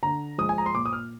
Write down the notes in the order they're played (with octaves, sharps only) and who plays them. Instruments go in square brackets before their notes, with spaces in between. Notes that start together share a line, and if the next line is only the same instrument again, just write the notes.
[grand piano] D3 A#5
F3 G#3 D#6
G#5
A#5
C6
A#2 D6
D#6
F6